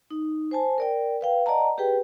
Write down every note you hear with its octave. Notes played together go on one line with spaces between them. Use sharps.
D#4
C5 G#5 A5
A#4 D5 G5
B4 F5 G5
D5 D#5 F#5 A5 A#5
G4 G#4 B4 G5